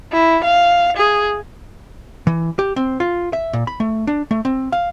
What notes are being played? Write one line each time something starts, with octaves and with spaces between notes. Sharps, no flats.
E4
F5
G#4
E3
G4
C4
F4
E5
A#2
B5
A3
D4
A3
C4
F5